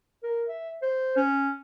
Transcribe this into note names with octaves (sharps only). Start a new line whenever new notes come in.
A#4
E5
C5
C#4